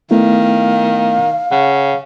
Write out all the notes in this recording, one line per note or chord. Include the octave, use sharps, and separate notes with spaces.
D#3 A3 B3 E4 F5
C#3 F#5